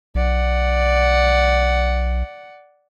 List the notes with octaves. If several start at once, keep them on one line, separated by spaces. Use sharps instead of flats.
B1 D5 F#5